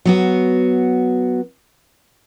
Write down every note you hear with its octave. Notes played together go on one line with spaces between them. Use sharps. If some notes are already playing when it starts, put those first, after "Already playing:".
F#3 B3 F#4